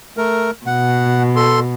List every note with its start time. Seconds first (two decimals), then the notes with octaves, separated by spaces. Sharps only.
0.17 A3 A#4
0.67 B2 F#5
1.36 A4 C6